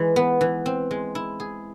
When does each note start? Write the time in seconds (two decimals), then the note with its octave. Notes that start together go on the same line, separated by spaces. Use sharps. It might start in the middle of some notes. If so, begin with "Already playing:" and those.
Already playing: E3 G#3
0.16 B3
0.41 E3
0.66 C4
0.91 G#3
1.15 E4
1.40 G#4